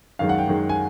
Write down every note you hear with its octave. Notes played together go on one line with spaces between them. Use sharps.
F#2 D#3 G#3 F5
F#5
G5
F#2 D#3 G#3
G#5